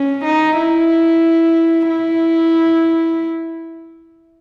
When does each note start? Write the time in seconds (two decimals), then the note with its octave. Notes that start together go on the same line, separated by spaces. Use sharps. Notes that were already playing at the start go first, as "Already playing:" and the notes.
Already playing: C#4
0.24 D#4
0.58 E4
1.89 E4